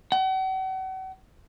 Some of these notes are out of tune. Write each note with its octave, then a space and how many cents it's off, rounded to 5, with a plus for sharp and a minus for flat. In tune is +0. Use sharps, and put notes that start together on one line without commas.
F#5 +40